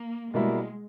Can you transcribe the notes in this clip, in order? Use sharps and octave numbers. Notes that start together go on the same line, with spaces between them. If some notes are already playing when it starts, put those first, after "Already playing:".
Already playing: A#3
B2 G3 G#3 A#3 E4